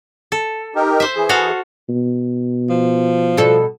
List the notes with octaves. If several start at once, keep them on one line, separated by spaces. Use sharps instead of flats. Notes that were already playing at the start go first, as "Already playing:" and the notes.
A4
D#4 G4 A#4
C5 E5
E3 G#4
F#4 A4 F5
B2
F3
B2 A4